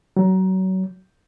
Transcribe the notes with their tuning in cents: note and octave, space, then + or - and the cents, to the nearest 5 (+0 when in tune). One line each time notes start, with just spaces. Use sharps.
F#3 +25